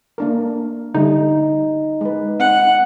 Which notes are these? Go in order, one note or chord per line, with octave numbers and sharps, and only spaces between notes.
A#3 D4 A#4
D3 G3 D#4
G#3 B4
C4 F#5